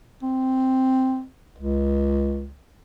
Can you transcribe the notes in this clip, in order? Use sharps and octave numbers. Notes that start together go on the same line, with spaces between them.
C4
C#2